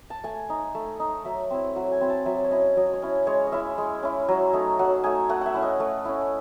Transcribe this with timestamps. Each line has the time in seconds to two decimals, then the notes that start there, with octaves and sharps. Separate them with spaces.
0.10 A5
0.24 A3 G#5
0.50 D#4
0.75 A3
1.00 D#4
1.25 F#3 E5
1.50 C4 E4
1.76 F#3 F#5
1.92 G#5
2.01 C4 E4
2.10 A5
2.26 F#3 E5
2.44 C#5
2.51 C#4 E4 D#5
2.77 F#3 D#5
2.94 C#5
3.02 C#4 E4
3.27 G#3 C#5
3.47 D#5
3.52 C#4 E4 E5
3.78 G#3
4.03 C#4 E4
4.28 F#3
4.53 A3 D#4
4.79 F#3 F#5
5.04 A3 D#4 G#5
5.29 A3 F#5
5.41 E5 F#5
5.54 C#4 E4
5.62 D#5
5.80 A3
6.05 C#4 E4